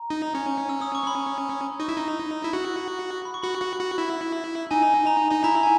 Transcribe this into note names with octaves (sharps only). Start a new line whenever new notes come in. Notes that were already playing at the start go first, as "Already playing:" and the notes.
Already playing: A#5
D#4
C#4
E6
D#6
C#6
B5
D#4 C#6
E4
D#4
E4
F#4
B5
C#6
F#4 B5
F#4
F#4
E4
D#4 G#5
A#5
D#4
E4 A#5
G#5